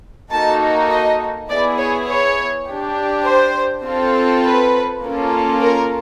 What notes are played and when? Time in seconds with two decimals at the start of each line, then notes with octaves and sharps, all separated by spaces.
0.32 A#3 D#4 F#4 A4 A5
0.91 D#5
1.49 B3 E4 G#4 D5
1.79 C#5
2.09 C#5
2.68 D4 G4
3.26 C5
3.85 C4 F4 A4
4.44 B4
5.04 A#3 C#4 F4 A4
5.63 A#4